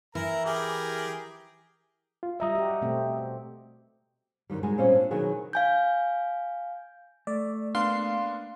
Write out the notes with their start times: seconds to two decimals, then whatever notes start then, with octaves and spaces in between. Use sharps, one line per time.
0.15 E3 E4 A#4 A#5
0.45 G4 G#4 A#4
2.23 F4
2.40 G3 D#5 E5 A#5 D#6
2.55 F#4 G4
2.82 B2 A3 C4
4.50 F#2 D#3 G3
4.63 C3 G3 G#3 D#4 F#4 G#5
4.78 A#2 G3 C4 C#4 F4 D#5
4.95 D4
5.11 B2 D#3 F#3 G#4
5.53 F5 G#5 G6
7.27 A3 D5
7.75 A#3 B3 D4 F5 C6